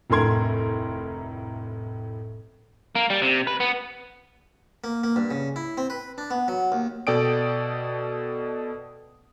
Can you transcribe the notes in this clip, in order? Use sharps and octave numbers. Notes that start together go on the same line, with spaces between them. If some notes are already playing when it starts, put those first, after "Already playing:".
F1 D2 A2 A#4 C6 G#6
A#3
G3
C3
B4
B3
A#3
A#3
G2
C#3
E4
C4
B4
D4
B3
F#3
D#2
B2 A4 D5 G5 D#6 D7